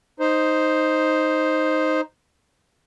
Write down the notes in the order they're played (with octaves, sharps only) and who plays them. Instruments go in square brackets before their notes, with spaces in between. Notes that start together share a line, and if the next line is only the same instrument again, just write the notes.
[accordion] D#4 C5